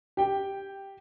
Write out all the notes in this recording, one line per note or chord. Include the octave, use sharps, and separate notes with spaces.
G4 G5